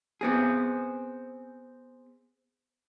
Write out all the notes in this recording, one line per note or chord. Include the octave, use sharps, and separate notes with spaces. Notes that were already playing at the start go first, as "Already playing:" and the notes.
B3 C4 G#4